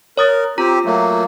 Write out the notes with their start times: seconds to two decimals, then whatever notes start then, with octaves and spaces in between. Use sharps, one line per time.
0.18 A#4 C#5 D#6 A6
0.58 C4 F4 G4 A#5
0.85 F#3 A3 A#3